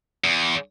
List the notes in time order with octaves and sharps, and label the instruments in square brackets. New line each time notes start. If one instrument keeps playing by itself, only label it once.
[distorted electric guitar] E2